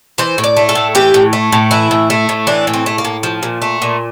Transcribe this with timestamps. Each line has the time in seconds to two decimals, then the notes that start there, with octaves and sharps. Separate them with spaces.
0.18 E3 C5
0.38 A2
0.44 D5
0.57 A3
0.69 A4
0.75 A2
0.95 E3 G4
1.14 A2
1.33 A3
1.52 A2
1.71 E3 E4
1.91 A2
2.10 A3
2.29 A2
2.47 E3 D4
2.67 A2
2.74 C4
2.86 A3
2.98 A#3
3.05 A2
3.23 F3
3.43 A#2
3.62 A3
3.82 A#2